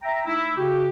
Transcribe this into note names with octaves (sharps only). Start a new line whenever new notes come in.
E5 G5 A#5
A3 D#4 E4
C#3 F#4 G4